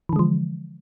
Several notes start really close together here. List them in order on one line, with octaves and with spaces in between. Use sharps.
E3 D3 G#3 F3